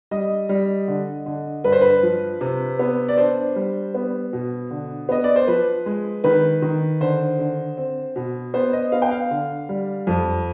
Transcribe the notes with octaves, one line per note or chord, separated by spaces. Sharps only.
G3 D#5
G3
D3
D3
G2 B4
C5
B4
F3
C3
B3
D5
D4 C5
G3
B3
B2
D3
B3 D#5
D5
C5
F3 B4
G#3
D#3 B4
D#3
D3 C5
D3
C4
B2
B3 C5
D#5
B3 F5
G5
F5
D3
G3
F2